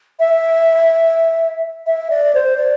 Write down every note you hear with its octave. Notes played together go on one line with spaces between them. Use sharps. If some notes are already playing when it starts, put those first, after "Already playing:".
E5
E5
D5
C5
D5